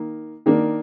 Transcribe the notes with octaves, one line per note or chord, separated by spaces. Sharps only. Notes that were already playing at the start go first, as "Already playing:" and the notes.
Already playing: D#3 A#3
D#3 A#3 D4